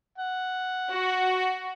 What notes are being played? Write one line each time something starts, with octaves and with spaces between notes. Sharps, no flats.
F#5
F#4